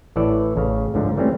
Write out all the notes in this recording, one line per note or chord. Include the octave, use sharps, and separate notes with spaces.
A1 A2 E3 A4 D5
A1 C#3 F5
C#2 G#2 D3 F3
E3 G3 A3 C4 C#4